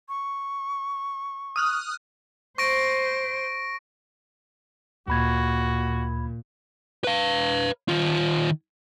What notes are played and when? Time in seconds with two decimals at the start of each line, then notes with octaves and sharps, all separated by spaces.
0.09 C#6
1.56 D#6 F6 F#6
2.58 C5 C#6 A#6 D7
5.08 D2 A#2 F#4 B5 G#6
7.04 B4 F5
7.89 D#3 F4